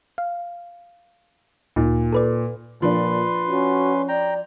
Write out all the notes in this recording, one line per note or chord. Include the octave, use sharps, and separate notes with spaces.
F5
D2 A#2 D#4
A4 B4 D5
A#2 F3 D4 B4 C6
C#4 F#4
D5 G5 A#5